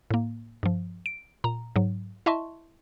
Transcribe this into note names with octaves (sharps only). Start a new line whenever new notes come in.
A2 A#3
G2 F3
D7
A#2 A#5
G#2 F#3
E4 D#5 E5 A5 C6 C#6